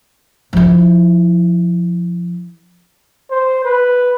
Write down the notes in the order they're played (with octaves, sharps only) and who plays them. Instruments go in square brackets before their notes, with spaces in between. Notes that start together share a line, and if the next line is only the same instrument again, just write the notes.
[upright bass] F3 E4
[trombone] C5
B4